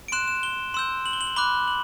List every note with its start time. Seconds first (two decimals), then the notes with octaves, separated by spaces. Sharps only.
0.08 D7
0.12 C6 F#6 E7
0.28 E7
0.43 G7
0.74 C6 E6 G6 E7
1.06 F#7
1.13 G7
1.21 F#7
1.36 B5 D6 F#6 G7
1.68 F#7